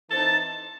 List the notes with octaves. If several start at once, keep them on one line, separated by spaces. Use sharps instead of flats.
E3 C4 D#4 A5